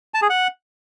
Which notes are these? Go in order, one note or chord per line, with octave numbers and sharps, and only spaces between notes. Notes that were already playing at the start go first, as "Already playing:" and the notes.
A5
G#4
F#5